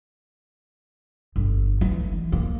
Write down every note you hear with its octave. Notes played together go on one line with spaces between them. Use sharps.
G1
E3
A#3